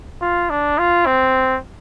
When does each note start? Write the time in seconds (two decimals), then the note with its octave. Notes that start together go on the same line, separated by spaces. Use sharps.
0.21 F4
0.50 D4
0.78 F4
1.06 C4